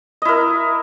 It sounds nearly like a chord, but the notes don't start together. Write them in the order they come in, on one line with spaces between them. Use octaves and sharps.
D#5 E4 A#4